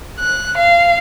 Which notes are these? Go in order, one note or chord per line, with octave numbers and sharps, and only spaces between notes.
F#6
F5